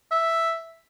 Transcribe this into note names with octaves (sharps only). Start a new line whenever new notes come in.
E5